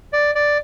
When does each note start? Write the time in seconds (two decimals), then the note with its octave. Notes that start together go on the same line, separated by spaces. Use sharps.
0.13 D5
0.35 D5